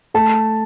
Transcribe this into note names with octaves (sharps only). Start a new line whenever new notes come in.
A3 A5